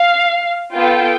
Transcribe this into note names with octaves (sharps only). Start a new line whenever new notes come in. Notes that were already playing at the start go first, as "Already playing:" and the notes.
Already playing: F5
B3 F4 A4 G5